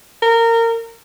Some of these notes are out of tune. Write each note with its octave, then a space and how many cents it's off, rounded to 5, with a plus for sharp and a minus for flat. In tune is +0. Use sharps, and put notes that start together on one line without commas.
A#4 -20